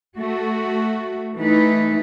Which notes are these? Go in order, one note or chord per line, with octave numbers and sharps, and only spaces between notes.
A3 F#4
E3 A3 D#4 B4